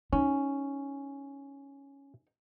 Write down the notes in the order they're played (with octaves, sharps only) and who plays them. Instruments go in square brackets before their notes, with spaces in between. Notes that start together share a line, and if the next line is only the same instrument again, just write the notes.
[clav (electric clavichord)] C#4 [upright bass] D#4